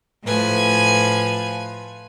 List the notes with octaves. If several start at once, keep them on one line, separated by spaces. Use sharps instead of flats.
A2 F3 B4 G#5